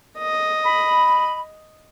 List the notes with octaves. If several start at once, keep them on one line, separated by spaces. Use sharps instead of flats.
D#5
B5